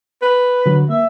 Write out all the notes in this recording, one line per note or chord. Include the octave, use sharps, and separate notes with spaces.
B4
D3 F#3
A#3 E5